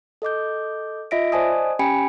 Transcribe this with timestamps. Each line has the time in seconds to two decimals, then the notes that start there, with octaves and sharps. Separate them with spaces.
0.22 A4 D#5 D6 G6
1.11 F4 D#5 E5 A#6 B6 D7
1.32 C5 D5 D#5 G#5 A5 D#6
1.79 C#4 G4 G5 G#5 B5 C#7